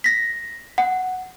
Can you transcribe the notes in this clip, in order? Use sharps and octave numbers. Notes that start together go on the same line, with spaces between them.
A#6 B6
F#5